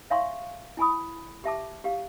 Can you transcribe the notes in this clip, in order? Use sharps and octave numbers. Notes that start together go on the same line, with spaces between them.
C#5 E5 F5 G#5 C6 C#6
E4 G#5 B5 D#6
G4 E5 A5 D6
G4 F5